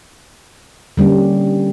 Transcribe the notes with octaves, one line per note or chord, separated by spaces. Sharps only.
D3 G3 A#3 C#4